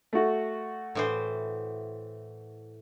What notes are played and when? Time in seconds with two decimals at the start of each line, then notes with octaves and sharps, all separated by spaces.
0.13 A3 F#4
0.95 A2 E3 C5